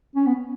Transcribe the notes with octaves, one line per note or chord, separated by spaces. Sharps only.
C#4
B3